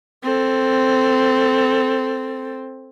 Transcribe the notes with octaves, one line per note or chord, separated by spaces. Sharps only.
C4 A4